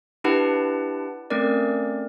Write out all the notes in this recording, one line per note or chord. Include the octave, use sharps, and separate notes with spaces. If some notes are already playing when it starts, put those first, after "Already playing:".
D4 E4 G4 B4 F#5 A5
A3 C4 C#4 A#4 D5